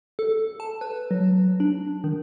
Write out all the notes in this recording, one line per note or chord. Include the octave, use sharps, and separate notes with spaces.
A4
A5
B4
F#3
D4
D#3